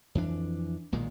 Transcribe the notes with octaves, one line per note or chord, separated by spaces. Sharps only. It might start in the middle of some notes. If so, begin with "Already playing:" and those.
F2 E3 D4
B1 A#2 D#3 G#3